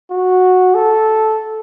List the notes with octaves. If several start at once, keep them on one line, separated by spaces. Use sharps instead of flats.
F#4
A4